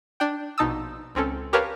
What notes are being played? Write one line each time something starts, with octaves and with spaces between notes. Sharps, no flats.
D4 G5
A#1 B2 D#4 A5 D#6 E6
C#2 C4 C#4 A4
G4 A#4 B4 C#5 F5 A5